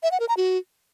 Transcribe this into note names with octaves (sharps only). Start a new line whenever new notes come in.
E5
F#5
A#4
A#5
F#4